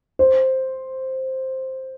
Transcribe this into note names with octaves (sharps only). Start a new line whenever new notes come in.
C5